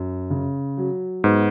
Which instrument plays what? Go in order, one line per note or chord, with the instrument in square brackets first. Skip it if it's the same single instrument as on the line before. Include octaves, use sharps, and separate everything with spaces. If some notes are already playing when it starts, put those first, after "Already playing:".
Already playing: [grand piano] F#2
C#3
F#3
[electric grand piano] G#2 [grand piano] B3